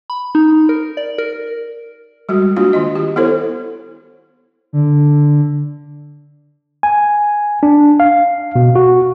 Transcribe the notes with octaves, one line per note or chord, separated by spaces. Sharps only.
B5
D#4
A#4
D5
A#4
G3 G#3 F#4
A#3 D4 F4 F#4
D#3 F4 D#5
G4
B3 E4 A4 C5 C#5
D3
G#5
D4
F5
B2
F#4